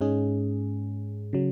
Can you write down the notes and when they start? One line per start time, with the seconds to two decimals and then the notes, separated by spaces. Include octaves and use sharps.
0.01 G#2 G#3 C#4 G#4
1.33 C#3 F#3